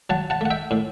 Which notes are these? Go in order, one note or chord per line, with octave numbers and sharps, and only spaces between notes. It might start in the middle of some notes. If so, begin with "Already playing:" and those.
F#3 F#5 A5
F#5 A5
A3 F#5
E5 G5
A2